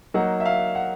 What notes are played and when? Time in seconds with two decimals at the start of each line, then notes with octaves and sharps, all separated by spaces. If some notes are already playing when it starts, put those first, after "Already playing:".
0.14 F#3 A#3 D#4 F#5
0.40 E5
0.46 F5
0.75 F#5